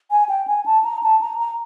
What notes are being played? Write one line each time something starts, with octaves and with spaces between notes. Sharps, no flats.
G#5
G5
G#5
A5
A#5
A5
A#5
A#5